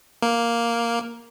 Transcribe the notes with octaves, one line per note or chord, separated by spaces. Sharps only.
A#3